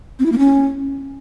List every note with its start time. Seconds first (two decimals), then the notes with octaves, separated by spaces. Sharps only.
0.19 C4
0.26 E4
0.32 A#3
0.39 C#4